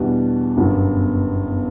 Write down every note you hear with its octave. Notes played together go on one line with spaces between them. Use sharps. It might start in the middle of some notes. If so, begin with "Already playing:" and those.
Already playing: E2 B2 G3 D4 F#4
G1 F#2 D3 F#3 B3